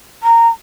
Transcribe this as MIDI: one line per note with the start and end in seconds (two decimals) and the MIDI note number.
0.23 0.49 82